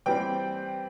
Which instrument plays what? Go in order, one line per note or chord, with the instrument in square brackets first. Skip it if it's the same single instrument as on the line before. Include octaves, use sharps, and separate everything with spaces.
[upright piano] E3 G3 C4 G5